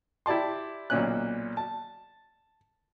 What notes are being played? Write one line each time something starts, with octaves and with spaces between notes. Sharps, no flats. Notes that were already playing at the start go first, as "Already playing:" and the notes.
E4 G4 D5 A5 C6
B1 A#2 C#4 F#6
A5